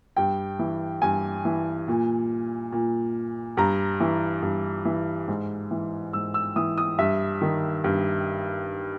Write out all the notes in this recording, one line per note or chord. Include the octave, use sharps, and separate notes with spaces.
G2 G5
E3
G2 G#5
E3
A#2
A#2
G2 A#5
E3
G2
E3
G#2
E3
G#2 E6
E6
E3 D#6
D#6
G2 E5
D#3
G2